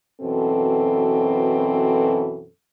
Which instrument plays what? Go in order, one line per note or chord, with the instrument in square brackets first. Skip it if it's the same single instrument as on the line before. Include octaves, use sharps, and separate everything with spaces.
[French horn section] F#2 B2 E3 C4 A4